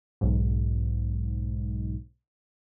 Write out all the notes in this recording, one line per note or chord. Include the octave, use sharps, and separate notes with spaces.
B1 G#2